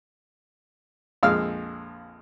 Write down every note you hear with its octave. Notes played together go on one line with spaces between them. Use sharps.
A#1 F2 G#3 F5 E6 F6